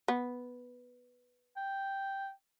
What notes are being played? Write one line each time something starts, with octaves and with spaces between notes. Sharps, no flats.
B3
G5